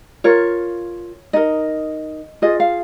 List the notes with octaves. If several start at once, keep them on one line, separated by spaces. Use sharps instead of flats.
F4 A#4 C#5
D#4 A#4 D#5
F4 G#4 D#5
F5